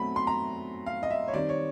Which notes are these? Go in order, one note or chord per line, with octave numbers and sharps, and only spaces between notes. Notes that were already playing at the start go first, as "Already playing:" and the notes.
Already playing: B2 F#3 A3 C4 B5
C6
A#5
F5
D#5
E5
C#5
D#3 G3 C4 D5
C#5